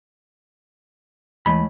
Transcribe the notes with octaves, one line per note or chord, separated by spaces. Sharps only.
D#2 A2 E3 G#3 B5